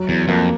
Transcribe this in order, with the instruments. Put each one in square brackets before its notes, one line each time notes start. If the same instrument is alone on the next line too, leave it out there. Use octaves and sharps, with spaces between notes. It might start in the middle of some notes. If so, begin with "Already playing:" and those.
Already playing: [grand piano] F#3
[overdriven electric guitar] E2
[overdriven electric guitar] F2 [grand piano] A#3